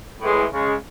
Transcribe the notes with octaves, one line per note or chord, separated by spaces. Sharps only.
A2 E3 G#3
C#3 G#3